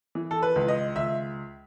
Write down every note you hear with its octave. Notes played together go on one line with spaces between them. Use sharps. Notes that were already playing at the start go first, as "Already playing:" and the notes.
E3
A4
B4
C#2
D#5
C#2 E5